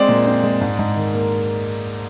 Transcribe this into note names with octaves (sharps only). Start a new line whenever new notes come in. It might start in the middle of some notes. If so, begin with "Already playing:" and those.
Already playing: G#3 C4 D5
A#2
C4
G#3
G#2
G#2
D#3
A#3